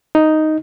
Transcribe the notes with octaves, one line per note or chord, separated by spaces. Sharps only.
D#4